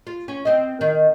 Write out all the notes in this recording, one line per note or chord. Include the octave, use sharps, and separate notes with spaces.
F4
C#4
C4 D#5
D#3